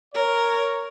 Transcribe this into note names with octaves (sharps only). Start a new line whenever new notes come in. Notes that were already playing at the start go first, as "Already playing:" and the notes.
A#4 C#5